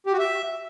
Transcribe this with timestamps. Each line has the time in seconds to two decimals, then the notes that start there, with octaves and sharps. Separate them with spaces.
0.06 G4
0.13 F#4
0.19 E5